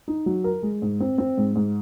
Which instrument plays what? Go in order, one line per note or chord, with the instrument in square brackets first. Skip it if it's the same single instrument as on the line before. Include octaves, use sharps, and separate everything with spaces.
[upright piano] D#4
F#3
A#4
G#3
G#2
C4
C4
G#2
G#2